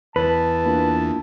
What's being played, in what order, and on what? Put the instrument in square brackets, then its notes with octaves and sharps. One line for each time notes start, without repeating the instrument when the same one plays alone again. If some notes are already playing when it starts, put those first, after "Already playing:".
[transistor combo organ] E2 [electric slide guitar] B4 [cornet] A5
[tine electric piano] A#3 D4 F4